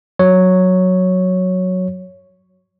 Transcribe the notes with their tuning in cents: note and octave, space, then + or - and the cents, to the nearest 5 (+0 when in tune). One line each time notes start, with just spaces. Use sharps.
F#3 -5 C#5 +0